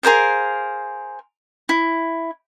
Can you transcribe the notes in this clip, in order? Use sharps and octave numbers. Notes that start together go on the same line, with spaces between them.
G#4 A#4 C5 F5
E4